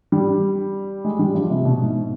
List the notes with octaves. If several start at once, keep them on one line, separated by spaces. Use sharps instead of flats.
G3
G#3
G3
F3
C3
B2
G#2